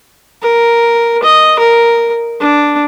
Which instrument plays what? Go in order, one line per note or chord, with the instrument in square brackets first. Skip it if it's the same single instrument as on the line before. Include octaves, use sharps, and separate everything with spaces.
[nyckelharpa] A#4
D#5
A#4
D4